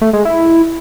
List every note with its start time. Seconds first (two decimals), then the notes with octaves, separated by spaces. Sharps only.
0.01 A3
0.13 G#3
0.25 E4